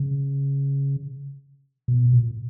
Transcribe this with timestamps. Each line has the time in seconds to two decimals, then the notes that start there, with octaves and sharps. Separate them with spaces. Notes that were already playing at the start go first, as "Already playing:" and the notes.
Already playing: C#3
1.88 B2
2.13 A#2